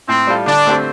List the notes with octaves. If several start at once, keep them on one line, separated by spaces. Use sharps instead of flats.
A2 C4
G3 F4 A4
D3 D4
A3 C4 G4 C5